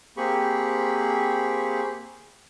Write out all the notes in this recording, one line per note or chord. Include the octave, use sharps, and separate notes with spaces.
A#3 C4 G4 G#4 B5 C#6